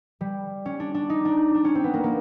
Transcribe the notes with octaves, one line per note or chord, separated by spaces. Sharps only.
G3
C#4
D4
D4
D#4
D4
D4
C#4
C4
B3
A#3
A#3